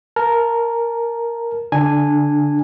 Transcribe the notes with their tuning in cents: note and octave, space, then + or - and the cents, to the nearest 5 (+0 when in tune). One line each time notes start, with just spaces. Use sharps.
A#4 +0 A5 -20
D3 -25 D4 +5 G#5 -10